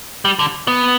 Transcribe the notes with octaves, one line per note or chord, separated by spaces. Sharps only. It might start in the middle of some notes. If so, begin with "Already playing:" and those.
G3
D3
B3